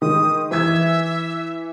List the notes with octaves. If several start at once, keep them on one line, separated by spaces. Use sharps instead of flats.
D#3 G#3 D#6
E3 E5 G#6